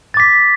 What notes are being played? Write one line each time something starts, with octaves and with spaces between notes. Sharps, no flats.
D6 A6 B6